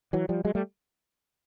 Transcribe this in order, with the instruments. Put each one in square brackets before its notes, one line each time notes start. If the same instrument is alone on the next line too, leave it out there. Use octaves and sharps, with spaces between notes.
[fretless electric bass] E3 F#3
F3 G3
F#3 G#3
G3 A3